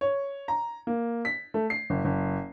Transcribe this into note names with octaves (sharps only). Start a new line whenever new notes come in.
C#5
A#5
A#3
B6
A3
C7
F#1
F#1